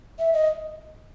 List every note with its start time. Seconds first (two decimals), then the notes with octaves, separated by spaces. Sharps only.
0.19 E5
0.33 D#5